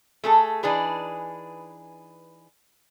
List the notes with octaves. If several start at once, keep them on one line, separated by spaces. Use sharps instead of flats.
A3 G#4 A4
E3 D4 D#4 G#4 B4